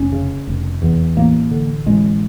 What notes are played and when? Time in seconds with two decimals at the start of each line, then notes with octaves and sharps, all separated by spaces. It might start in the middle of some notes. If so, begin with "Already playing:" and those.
Already playing: F1 C#4
0.12 C#3
0.47 F1
0.82 E2
1.17 A1 A#3
1.51 D3
1.86 A1 G#3